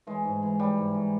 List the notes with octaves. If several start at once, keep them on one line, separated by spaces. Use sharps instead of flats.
E3 G#3
G#2
E3
E3 G3
G#2
G#2